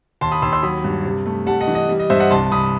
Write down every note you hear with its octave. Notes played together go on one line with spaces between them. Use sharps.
D#2 A5 C6
B5 D#6
D#2 C6 E6
C6 E6
F#3 B5 D#6
G2
C3
A3
G3 F#5 A5
D#5 F#5
E3
D#5
G3
D#5
G2 C5 E5
D#5 F#5
C2 A5 C6
C2 B5 D#6